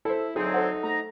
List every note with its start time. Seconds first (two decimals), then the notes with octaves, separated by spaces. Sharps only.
0.05 E4 A4 C5
0.36 D2 F#3 C4 D#4 G#4
0.54 A4 C5 F#5
0.83 A3 A#5